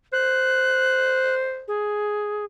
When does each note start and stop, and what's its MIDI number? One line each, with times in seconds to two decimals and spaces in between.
0.13 1.64 72
0.13 1.35 90
1.68 2.45 68